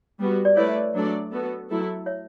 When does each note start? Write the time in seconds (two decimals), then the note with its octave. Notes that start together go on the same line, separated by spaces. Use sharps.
0.20 G3 B3 F#4
0.45 D5
0.57 A3 E4 B4 C#5 D5 E5
0.94 F#3 A3 D4 A4 D5
1.31 B3 F#4 A4
1.69 F#3 A3 E4 A4
2.06 C#5 E5